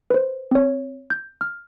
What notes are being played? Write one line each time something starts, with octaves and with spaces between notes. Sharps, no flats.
B4 C5
C4 C#5
G6
F6